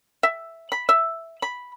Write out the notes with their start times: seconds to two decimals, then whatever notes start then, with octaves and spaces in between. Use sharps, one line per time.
0.23 E5
0.72 B5
0.89 E5
1.42 B5